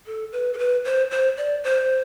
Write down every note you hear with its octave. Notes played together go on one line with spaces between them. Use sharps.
A4
B4
A4
B4
C5
C5
D5
C5